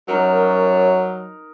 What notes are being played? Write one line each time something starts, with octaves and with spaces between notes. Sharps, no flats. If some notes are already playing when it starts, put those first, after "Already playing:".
F#2 F#3 D#4 A#4